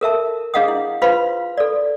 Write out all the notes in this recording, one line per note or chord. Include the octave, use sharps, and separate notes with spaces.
A4 A#4 E5 A5
D4 G#4 D#5 F5 F#5 D#6
E4
F4 B4 C5 F5 B5 C6
A4 D5